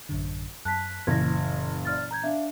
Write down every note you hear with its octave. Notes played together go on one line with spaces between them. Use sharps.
A1 F#2 D3
F#2 A5 F#6 B6
F#1 A#2 E3 G#6 A#6
D5 F6 A6
A#5 G6 G#6
D4 E5 F5